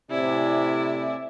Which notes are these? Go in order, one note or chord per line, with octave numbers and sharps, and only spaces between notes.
A2 C3 E4 D5 G#5